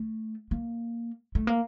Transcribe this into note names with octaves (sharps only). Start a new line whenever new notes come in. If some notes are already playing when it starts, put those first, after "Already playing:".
Already playing: A3
A#3
A3
A#3